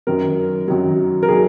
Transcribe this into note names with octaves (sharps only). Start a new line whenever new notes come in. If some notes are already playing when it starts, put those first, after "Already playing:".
F#2 D#3 F#3 A#4
F#2 D#3 F#3
A#4
D#3 F#3 G#4